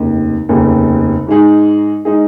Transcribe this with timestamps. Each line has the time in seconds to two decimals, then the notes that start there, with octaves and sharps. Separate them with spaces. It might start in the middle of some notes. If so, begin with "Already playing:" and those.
Already playing: F1 D#2 C#3
0.49 F1 D#2 C#3
1.27 G#2 G#3 D#4 G#4
2.05 G#3 D#4 G#4